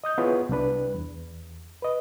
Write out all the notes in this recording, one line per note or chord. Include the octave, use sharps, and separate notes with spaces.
D#5 D#6 G6
B3 E4 F4 G#4 B4 C#5
C2 G3 D4 B4
E2
B4 D#5